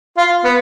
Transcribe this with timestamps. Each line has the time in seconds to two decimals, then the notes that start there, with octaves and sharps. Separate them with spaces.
0.18 F4
0.45 B3